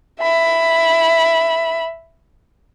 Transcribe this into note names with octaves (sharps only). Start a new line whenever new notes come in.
E5 B5